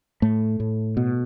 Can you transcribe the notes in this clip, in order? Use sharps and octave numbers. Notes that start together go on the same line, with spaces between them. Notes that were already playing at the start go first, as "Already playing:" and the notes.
A2 A3
A2
B2